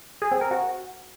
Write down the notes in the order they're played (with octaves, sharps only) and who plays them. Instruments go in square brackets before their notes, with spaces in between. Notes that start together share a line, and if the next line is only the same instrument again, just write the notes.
[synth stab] G#4
C4
A#4
F#4